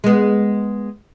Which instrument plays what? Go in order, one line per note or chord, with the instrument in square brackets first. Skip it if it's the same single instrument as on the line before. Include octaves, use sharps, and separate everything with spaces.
[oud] G#3 B3